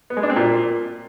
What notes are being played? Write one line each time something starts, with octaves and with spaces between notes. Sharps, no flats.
B3
G#3
D4
C4
A#2